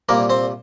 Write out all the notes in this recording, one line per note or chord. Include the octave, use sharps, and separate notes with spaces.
C2 A#2 G3 A#3 A#4
C4 C5